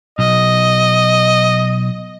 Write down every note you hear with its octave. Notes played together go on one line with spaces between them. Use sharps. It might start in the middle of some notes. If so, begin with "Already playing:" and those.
B1 D#5